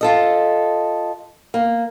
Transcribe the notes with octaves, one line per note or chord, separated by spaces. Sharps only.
F4 A4 D#5
A#3